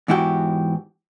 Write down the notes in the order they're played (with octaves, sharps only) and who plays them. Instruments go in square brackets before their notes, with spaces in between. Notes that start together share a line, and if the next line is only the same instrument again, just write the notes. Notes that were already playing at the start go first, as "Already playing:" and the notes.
[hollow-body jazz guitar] E2 G#2 E4 F#4 G4